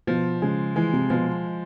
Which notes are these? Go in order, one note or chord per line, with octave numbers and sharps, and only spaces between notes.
B2 F3
C#3 G#3
E3 G#3
C3
B2 F3